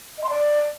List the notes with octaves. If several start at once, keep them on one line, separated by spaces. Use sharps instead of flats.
D#5
C6
D5